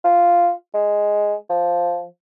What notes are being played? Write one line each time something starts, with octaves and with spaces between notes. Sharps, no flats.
F4
G#3
F3